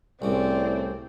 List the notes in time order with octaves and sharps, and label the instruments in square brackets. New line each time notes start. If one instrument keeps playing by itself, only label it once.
[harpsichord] C2 C#3 [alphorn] A2 [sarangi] C4 [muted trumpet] D5